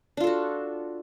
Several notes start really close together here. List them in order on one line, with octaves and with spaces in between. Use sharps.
D4 F4 A4 F#4